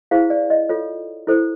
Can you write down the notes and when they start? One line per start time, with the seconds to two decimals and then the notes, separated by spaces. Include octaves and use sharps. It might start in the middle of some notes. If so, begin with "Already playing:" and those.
0.11 E4 G#4 C5 F5
0.30 D5
0.50 D#5
0.69 F4 A4 C#5
1.27 E4 A4 C5